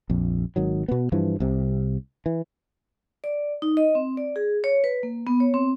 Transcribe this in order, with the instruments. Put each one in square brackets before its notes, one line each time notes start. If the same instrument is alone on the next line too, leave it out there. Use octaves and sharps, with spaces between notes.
[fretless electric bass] A#1 F2
G#1 D#3 F#3
B2 B3
G2 E3 F3
C2 C3
E3
[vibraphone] D5
D#4
D#5
C4
D5
G#4
C#5
B4
A#3
B3
C#5
C4